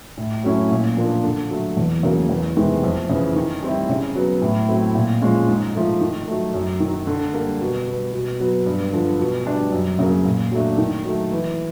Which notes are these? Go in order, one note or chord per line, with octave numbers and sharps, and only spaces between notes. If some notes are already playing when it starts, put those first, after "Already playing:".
A2
F#3 A3 C#4 E4
A#2
F3 A#3 D4 F4
D3
F#3 A3
E2
C#3 F#3 A#3
E2
C3 D#3 G#3 B3
F2
C#3 E3
D#3
G3 C4 E4
C#3
F#3 B3
A2
F#3 A3 C4 E4
A#2
F3 G#3 C#4
G#2
F3 A3
D#3
F#3 A3
F#2
D#3 F#3
D3
G3 A#3
B2
G3 B3
B2
F#3 B3
G2
D3 F3
B2
G3 B3 D4
F#2
C#3 F#3 A#3
A#2
F#3 A3 D4
D#3
F#3 A3
E3